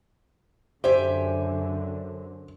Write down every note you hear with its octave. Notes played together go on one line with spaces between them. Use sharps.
F#2 D3 G4 C5 E5 G#5